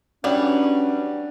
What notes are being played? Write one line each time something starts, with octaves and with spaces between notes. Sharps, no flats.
E3 F#3 G3 C#4 D4